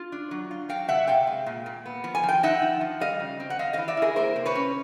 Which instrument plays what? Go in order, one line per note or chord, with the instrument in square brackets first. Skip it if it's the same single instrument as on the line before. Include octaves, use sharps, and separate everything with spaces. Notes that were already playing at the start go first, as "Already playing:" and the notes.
Already playing: [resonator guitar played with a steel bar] F4
D4
F#3
F4
F#3 F5 G5
C3 E5 F#5
C3 F5 G5
G#3
A#2
A#2
B3
F3
G#5
F3
G5
D#4 E5 F#5
F3
F3
G3 D#5 F5
C#3
C4
F#5
C4 D#5 F5
E3 D#5 F5
D5 E5
E4 G#4 A#4
A#3 A#4 C5
C3
B4 C#5
C#4